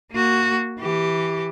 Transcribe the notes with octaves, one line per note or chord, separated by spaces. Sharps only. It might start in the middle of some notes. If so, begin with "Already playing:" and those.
A#3 F#4
E3 G4